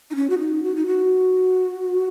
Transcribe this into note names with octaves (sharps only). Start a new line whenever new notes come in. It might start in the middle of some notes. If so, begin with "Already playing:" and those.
D#4
C#4
F#4
D#4
F#4
D#4
F#4